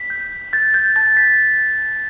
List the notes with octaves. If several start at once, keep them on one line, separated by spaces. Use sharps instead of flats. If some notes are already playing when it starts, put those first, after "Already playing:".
Already playing: B6
G6
G6 A6
G6
A5 A6
B6